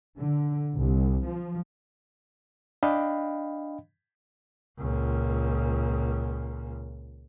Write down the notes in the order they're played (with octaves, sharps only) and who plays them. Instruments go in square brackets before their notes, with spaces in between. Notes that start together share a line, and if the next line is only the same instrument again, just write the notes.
[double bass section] D3
C2
F3
[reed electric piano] D4 D#5 F5 G5 B5
[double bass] C#2 A#2